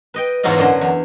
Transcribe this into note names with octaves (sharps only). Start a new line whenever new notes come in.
B4 D#5 G5
E2 G#2 F#3 E4 F4 D#5
F#2 D3 C6
E2